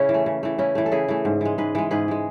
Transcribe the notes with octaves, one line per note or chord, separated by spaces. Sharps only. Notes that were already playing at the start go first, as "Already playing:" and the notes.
Already playing: C#3 C#4 E4
E3
A3
C#3
E3 A3
C#3 C#4 E4
E3 A3
A4
C#3 E4 G#4
E3 A3
G#2
E3 G#3
G#2 G#4 B4
E3 G#3
G#2 G#4 B4
E3 G#3